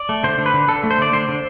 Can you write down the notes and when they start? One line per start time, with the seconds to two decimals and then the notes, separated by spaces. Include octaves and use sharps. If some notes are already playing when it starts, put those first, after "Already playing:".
Already playing: D5
0.09 A3
0.23 D3 C5
0.38 D3
0.46 B4
0.54 D3
0.68 D3 A4
0.84 A3
0.91 C5
0.98 D3 D5
1.13 D3 C5
1.29 D3